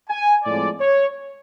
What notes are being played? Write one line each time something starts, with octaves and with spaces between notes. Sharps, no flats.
G#5
A2 F3 G#3 C4 D5
C#5